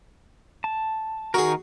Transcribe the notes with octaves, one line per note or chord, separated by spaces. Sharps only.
A5
D#3 D#4 F#4 G#4 A#4